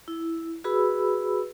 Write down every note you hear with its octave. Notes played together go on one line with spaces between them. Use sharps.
E4
F#4 G#4 B4 B5 E6